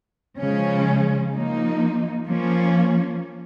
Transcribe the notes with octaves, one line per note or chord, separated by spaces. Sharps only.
C#3 F3 G#3 C#4
F3 A#3 D#4
F3 A#3 C#4